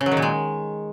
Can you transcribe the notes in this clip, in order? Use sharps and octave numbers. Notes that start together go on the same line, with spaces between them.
C#3
F#3
D#3
A#2
G#3